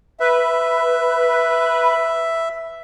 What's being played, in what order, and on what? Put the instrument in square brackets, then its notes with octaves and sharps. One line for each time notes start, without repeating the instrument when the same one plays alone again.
[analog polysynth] B4 [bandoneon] E5